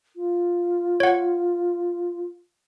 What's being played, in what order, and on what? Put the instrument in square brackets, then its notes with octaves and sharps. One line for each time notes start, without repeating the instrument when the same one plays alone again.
[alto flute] F4
[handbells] C#5 F#5